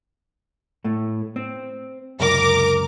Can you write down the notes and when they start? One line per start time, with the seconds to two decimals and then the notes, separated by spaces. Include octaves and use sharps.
0.84 A2 A3
1.36 C4
2.19 C#2 F#2 C3 A#4 D6